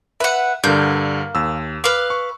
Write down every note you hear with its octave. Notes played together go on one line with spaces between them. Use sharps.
B4 E5 F#5
G2 D3 A#3 G6
D#2 E6
B4 F5 D6
C#6